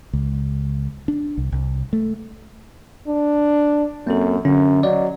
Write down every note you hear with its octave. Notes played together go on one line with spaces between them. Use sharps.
C#2
D4
C2
C2
A3
D4
F#2 A#3 C4 A4
F#2 D3 C#4
F#3 D5 D#5